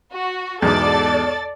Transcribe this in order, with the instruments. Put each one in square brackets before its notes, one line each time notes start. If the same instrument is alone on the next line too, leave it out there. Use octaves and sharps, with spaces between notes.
[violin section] F#4
[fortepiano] E2 G#2 B2 [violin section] A4 D5 A6